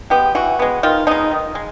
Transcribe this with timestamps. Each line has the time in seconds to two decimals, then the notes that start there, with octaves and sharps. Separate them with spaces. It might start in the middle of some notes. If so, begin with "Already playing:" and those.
0.10 G#3 B3 G4
0.35 E3 F#4
0.59 G#3 B3
0.83 D#3 F4
1.07 G#3 B3 D#4
1.31 D#3
1.55 G#3